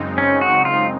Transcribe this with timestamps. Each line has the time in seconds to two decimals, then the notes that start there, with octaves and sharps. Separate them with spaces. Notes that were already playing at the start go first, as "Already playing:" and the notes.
Already playing: F#2 C#3 G#3 C4 D#4
0.18 C#4
0.41 F#4
0.65 F4